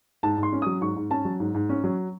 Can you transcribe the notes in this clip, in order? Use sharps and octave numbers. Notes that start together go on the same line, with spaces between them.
G#2 A5
G#2
C6
C#4
F#3 D#6
G#2 C#6
G#2
C#4 A5
F#3
G#2
G#2
C#4
F#3